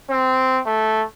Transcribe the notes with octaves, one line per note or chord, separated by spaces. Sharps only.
C4
A3